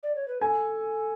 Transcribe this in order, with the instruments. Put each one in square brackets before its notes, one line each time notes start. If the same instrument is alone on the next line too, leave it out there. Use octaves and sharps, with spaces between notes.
[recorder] D5
C#5
B4
[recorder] A4 [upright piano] G#5